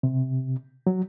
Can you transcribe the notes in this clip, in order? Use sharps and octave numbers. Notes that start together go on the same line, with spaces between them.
C3
F#3